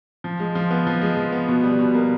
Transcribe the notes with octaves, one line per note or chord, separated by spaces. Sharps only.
F3
G#3
F3
B3
F3
G#3
F3
B3
B2
G3
B2
A#3